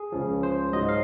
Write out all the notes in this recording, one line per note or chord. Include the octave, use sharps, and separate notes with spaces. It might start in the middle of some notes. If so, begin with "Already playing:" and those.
Already playing: G#4
C#2 C#3 F3
C5
G#2 F#3 D#5
D#5
F5